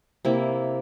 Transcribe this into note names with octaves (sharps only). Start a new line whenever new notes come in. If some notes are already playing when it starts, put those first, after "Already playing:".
C3 A#3 E4